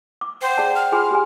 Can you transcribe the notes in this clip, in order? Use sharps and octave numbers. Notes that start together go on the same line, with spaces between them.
D6
C5 F#5 G5
G#4 D5 A5
F6
F4 G#4 G#5 C6
G4 G#4 G#5